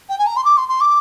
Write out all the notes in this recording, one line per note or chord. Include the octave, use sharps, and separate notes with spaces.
G5
G#5
A#5
C6
D6
C6
C6
D6